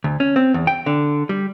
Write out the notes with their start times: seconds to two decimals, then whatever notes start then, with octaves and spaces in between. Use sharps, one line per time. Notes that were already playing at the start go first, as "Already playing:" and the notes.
0.04 D2
0.20 C#4
0.36 C4
0.54 E2
0.67 G5
0.86 D3
1.29 G3